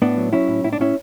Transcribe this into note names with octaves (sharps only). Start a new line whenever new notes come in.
A2 B3 D4
F#3
F#3 C#4 E4
A2
A2 E4
D4
A2 C#4 E4